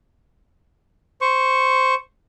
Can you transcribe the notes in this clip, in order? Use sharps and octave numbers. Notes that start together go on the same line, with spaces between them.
C5 C#6